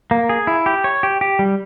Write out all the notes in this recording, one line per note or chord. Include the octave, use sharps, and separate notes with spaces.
A#3
G#4
E4
G4
C#5
G4
G4
G3